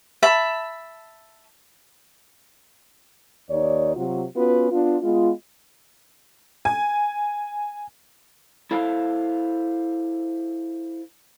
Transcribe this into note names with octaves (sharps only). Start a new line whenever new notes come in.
E5 A5 B5
D#2 D#4 C#5 D5
C3 F#3 F4 F#4
B3 C#4 F4 F#4 B4
B3 D4 F4
G#3 B3 F4
G#5
E4 A4 C5 F5